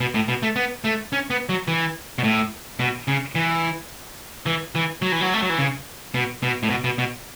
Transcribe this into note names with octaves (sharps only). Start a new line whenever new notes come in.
B2
A2
B2
A3
B3
A3
C#4
B3
F#3
E3
B2
A2
B2
C#3
E3
E3
E3
F#3
E3
F#3
A3
F#3
E3
C#3
B2
B2
A2
B2
B2
B2